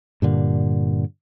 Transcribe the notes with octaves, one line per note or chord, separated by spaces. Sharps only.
G2 A#2 D3